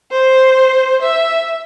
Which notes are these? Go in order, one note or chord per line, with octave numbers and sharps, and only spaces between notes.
C5
E5